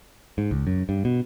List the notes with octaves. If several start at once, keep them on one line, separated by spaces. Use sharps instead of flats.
G#2
C#2
F#2
G2
B2